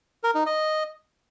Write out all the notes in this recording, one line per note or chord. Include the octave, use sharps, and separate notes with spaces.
A#4
D#4
D#5